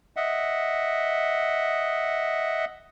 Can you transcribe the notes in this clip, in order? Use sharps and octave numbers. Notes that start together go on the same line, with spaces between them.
D#5 E5 F#5